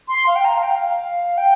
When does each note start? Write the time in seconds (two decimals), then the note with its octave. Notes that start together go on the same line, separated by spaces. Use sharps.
0.08 C6
0.27 F5
0.36 G5
0.45 A#5
0.55 F5
0.63 G5
0.70 F5
1.37 G5